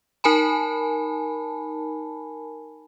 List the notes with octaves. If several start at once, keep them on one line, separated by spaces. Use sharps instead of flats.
D#4 A#4 G#5 A5 B5